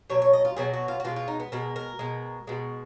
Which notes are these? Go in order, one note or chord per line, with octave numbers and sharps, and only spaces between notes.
B2 F#3 C#5
C#5
D#5
F4
B2 F#3 G#4
F#4
F4
F#4
B2 G#3 F4
F4
D#4
B3
B2 G#3 A#4
A#4
B2 G#3
B2 G#3